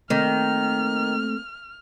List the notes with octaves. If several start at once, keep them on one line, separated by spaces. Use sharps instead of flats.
D#3 A3 A#3 C4 F6